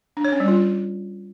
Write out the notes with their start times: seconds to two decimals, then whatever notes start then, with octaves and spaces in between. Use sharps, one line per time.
0.17 D4
0.25 C#5
0.32 C#4
0.40 G3
0.48 F4